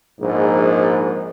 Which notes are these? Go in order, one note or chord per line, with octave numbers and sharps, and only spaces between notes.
A#1 G#2